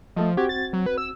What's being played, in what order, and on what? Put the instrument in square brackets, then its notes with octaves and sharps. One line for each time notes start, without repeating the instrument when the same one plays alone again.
[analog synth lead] F3 [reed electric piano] A3 A4 D#5
[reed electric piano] C4 F#4 G#6 [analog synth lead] G4
[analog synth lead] A6
F#3
B4
E6